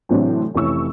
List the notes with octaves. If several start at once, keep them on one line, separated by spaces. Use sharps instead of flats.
A2 C3 E3 F#3 C4 D4
F1 E3 C#4 C#6 E6